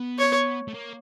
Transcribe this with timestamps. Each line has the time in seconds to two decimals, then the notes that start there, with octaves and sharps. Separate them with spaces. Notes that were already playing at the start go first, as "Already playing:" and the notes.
Already playing: B3
0.19 C#5
0.68 A3
0.74 A#3